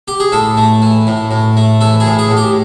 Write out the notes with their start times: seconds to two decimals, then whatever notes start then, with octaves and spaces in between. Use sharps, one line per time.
0.08 G4
0.20 G#4
0.32 A2 A4
0.57 A3
0.82 E3
1.07 A2
1.31 A2
1.57 A3
1.81 E3 A4
2.00 G#4
2.07 A2
2.19 G#4
2.31 A2
2.37 G4